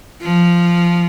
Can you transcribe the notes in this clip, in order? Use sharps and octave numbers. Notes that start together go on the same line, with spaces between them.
F3